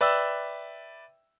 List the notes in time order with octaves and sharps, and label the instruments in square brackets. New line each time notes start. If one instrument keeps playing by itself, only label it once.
[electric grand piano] B4 D5 E5 G5 E6